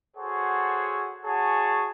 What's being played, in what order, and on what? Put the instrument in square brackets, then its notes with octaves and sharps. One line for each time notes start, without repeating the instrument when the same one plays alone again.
[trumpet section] F#4 G#4 A4 C5 C#5 F#5
F#4 G#4 C#5 G#5 A5